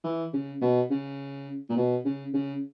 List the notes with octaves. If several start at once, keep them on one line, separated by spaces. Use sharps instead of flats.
E3
C#3
B2
C#3
A#2
B2
C#3
C#3